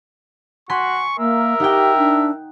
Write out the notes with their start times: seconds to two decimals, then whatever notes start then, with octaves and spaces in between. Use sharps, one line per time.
0.70 F#4 G#5 C6 C#6 B6
1.19 A#3 A#4 E5
1.60 D#4 G4 F#5 G5
1.97 D4